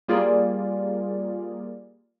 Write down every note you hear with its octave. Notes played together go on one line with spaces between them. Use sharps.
G3 A#3 F4 G#4 A#4 D5